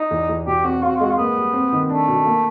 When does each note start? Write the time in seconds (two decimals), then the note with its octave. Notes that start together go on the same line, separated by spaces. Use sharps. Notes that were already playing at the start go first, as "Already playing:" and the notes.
Already playing: D#4
0.11 E2
0.29 E2
0.46 B2 G4
0.64 C4 F#4
0.82 C4 F4
0.89 F#4
0.96 F4
1.00 G#3 F#4
1.10 F4
1.18 A#3 B3
1.36 G3
1.53 C4
1.73 D#3
1.89 A3 D4
2.08 B2
2.26 A#3